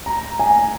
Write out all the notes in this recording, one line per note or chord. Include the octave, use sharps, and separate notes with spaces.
A#5
G#5